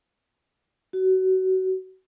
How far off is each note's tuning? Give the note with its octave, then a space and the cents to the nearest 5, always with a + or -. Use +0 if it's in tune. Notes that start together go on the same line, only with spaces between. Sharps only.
F#4 +25